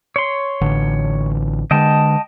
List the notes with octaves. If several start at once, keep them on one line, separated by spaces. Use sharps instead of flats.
C#5 C6
A1 D3
D3 G#3 D#5 G5 A5